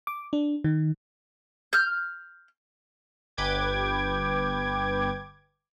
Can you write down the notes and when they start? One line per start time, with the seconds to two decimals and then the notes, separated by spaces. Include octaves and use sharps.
0.07 D6
0.33 D4
0.64 D#3
1.73 F6 G6
3.37 G1 B4 G5 D6 G#6